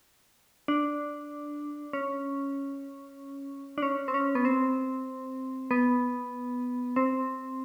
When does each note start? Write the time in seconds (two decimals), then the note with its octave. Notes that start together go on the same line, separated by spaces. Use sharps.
0.68 D4
1.93 C#4
3.78 D4
3.82 C#4
4.08 C4
4.14 C#4
4.35 B3
4.45 C4
5.71 B3
6.96 C4